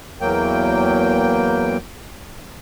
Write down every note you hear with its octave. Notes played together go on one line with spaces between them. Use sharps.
E2 F#3 A#3 G5